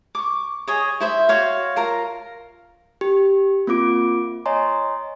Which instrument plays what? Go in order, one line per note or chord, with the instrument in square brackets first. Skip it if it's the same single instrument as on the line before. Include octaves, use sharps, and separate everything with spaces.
[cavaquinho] C#6 D6
G#4 C#5 D#5
E4 C5 E5
F#4 C5 C#5 F5
F4 A#4 A#5
[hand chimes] G4
A#3 C4 F4 D6 D7
C#5 D#5 G#5 A#5 C6